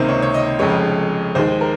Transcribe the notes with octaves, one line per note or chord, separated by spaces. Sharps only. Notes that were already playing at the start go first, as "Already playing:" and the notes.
Already playing: C#2 C3 D#3 A#3 C5
C#5
C#5
D#5
F1 F2 C#3 G#3 C#5
D#2 D#3 G#3 C5
A#4